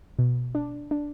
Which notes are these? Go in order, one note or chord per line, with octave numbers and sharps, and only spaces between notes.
B2
D4
D4